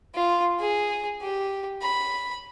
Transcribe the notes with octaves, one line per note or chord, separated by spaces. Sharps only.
F4
G#4
G4
B5